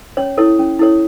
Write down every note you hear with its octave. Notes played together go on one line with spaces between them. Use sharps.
C#4 C#5
E4 A4 C#5
C#4
E4 A4 C#5